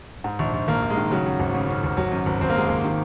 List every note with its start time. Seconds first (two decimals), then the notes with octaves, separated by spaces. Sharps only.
0.24 G#2
0.39 A#1
0.54 A#1
0.68 A#1 A#3
0.82 A#1
0.90 G#3
0.97 D#3
1.11 C#3 F#3
1.26 F#2
1.40 G#1
1.55 C#3
1.68 C#3
1.84 G#1
1.97 G#1 F#3
2.12 F#2
2.26 G#1
2.41 G#1 C4
2.50 A#3
2.55 F#2 G#3
2.65 G#1 A#3
2.84 D#3